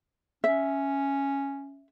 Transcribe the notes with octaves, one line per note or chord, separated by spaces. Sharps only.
C#4 E5